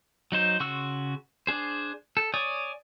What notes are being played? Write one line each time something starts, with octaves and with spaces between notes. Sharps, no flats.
F#3 D#4 C5
C#3 F#4 C6 C#6 E6
D4 G#4 C5
A4
C#5 D5 G#5 C#6 D#6